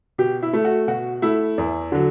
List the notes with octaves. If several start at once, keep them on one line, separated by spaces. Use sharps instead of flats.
B2 G4
E4
A3
F#4
B2 F#4
A3 E4
E2
D3 F#3